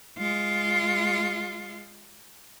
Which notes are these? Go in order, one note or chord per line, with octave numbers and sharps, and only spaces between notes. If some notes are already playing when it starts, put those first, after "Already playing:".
G#3 F4